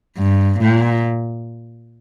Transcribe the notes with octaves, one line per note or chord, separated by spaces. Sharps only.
G2
A#2